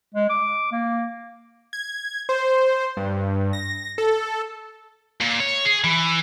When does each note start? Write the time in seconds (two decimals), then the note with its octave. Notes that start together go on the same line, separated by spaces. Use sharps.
0.14 G#3
0.29 D6
0.72 A#3
1.73 G#6
2.29 C5
2.97 G2
3.53 A#6
3.98 A4
5.21 A#2
5.40 C#5
5.65 G#4
5.84 E3